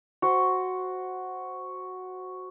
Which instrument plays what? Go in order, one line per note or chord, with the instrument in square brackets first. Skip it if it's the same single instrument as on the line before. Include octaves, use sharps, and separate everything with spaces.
[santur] F#4 C5